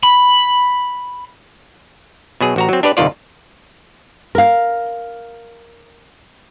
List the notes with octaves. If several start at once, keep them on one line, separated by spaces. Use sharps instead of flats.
B5
B2 F#3 G#4
A1 F#4 A#5
F#3 C4
D4 G4 B4 D5
G1 C2 D#3 F4 D5
A#4 F5